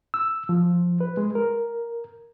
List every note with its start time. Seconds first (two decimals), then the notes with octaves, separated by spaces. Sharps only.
0.14 E6
0.49 F3
1.01 B4
1.17 G#3
1.35 A#4